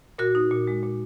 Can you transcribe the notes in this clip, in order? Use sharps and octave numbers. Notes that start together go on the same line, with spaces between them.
A#2 F#4 A#4
D#4
A#2
G#3
A#2